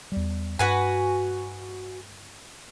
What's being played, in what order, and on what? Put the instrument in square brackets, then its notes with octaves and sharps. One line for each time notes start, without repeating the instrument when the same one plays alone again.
[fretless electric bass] E2 G3
[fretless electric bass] G2 [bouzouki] F#4 B4 G#5